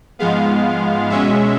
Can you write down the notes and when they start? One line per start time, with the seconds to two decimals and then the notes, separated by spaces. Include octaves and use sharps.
0.19 G#2 F3 G#3 B3 F5
1.10 B2 G#3 C#4 E5